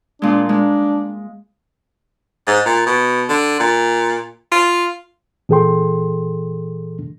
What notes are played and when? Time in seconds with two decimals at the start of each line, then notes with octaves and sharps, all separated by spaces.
0.22 A#2 G#3 D4
0.49 G#3 D4
2.47 G#2
2.66 A#2
2.86 B2
3.29 D3
3.60 A#2
4.51 F4
5.49 A#2 E3 G#4 A4 G5 C6